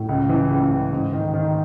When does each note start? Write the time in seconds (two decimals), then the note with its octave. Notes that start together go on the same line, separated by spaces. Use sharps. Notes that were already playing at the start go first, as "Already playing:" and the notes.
Already playing: A2
0.09 C#2
0.29 E3
0.51 C#2
0.71 C#2
0.92 G#2
1.12 D#3
1.34 D#3